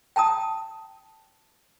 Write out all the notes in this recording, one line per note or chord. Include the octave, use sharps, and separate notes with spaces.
G5 A5 A#5 D#6